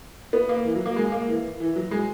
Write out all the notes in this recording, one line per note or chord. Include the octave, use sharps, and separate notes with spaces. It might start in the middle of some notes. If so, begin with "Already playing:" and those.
B3
A#3
E3
F#3
A#3
G#3
A#3
E3
E3
F#3
G#3